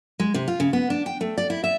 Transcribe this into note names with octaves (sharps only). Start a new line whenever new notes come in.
G#3
C3
F4
C#3
B3
D4
G5
A3
D5
E4
E5